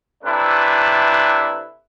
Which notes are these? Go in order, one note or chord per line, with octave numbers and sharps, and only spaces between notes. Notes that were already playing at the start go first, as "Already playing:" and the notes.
C3 A3 D4 E4 B4